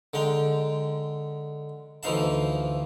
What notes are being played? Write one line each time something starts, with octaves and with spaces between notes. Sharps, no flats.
D3 G#3 G5 A#5
D2 E3 F3 D#4 F5 A5